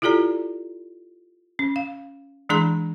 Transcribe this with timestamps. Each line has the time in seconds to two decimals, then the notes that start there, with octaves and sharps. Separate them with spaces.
0.02 E4 F4 G4 A4 D5 A#5
1.59 C#4
1.76 F5
2.49 E3 G#3 D4 G#4 A#5 C6